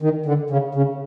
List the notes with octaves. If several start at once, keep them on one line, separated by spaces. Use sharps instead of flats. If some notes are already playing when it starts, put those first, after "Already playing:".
D#3
D3
C#3
C#3